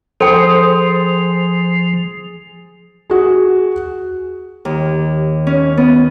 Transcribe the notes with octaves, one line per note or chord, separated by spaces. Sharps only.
F3 G#4 A4 C5 G5 D#6
F#4 G#4
D#2
C#4
B3